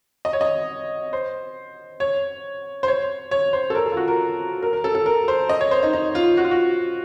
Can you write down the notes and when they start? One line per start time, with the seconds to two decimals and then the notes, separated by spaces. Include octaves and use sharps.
0.25 D#5
0.33 C#5
0.41 D#5
1.13 C5
2.00 C#5
2.83 C5
2.88 C#5
3.31 C#5
3.53 C5
3.70 A4
3.75 A#4
3.86 A4
3.92 F4
3.97 F#4
4.08 A#4
4.63 A#4
4.73 A#4
4.84 A4
4.95 A4
5.06 A#4
5.28 C5
5.49 D#5
5.61 C#5
5.71 C5
5.83 D#4
5.93 D#4
6.15 F4
6.37 F#4
6.44 F4
6.51 F#4